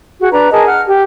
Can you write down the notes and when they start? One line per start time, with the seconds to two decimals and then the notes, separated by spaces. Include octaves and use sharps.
0.20 F#4 G#4
0.32 D4 B4 A#5
0.51 G#4 A#4 D#5 A5
0.66 F#5 F6
0.86 G4